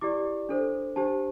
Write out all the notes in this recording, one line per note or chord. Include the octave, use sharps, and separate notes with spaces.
E4 G4 D5 D6
D4 A4 C5
D4 G4 C5 A5